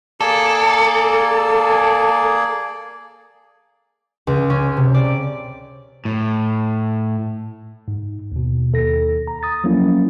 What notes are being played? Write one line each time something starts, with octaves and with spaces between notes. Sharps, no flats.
A#3 G#4 A4 D5
C#2
C#4
C3
D5
A2
G#2
D#2 B2
D#2 A4 A#6
A#5
D#6 A6
F3 F#3 A#3 C#4 E4